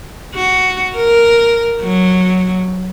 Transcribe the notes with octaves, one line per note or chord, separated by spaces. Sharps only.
F#4
A#4
F#3